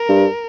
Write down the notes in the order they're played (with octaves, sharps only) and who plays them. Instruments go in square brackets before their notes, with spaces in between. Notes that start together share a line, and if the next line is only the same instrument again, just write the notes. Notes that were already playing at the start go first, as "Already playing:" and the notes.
Already playing: [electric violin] A#4
[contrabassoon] G2